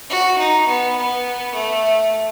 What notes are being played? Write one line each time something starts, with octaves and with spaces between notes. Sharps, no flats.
F#4
D#4
B3
B3
A3